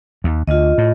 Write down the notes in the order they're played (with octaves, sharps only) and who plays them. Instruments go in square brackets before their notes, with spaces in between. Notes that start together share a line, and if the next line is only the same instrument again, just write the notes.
[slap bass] D#2
[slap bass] D2 [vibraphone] F4 D#5
[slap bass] A2